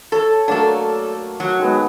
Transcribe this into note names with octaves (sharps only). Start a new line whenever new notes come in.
A4 C#5
F#3 A3 A#3 D4 A4
F#3
D#3 G#3 B3